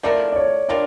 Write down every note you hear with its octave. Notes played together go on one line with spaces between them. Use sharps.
F3 A3 E4 A#4 D5
D5
C#5
G3 D4 F4 A#4 D5